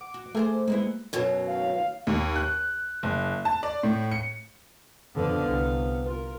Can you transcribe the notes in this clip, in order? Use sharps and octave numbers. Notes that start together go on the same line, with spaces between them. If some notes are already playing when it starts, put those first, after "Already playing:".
F#5 D6
F#4
A3 G#4 A#4 C5
G#3 A#3 B3 E4
F#2 B2 F#3
F5
D#2
F#6
F#1
A5
D5
A2
C#7
F2 D3 B3 F5
C2
F4 A#4